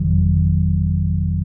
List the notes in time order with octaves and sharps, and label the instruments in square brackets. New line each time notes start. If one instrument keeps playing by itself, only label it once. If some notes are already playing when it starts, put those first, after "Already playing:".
Already playing: [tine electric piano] G1 F2 C3 D#3 F#3